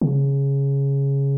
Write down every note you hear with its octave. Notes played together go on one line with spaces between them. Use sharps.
C#3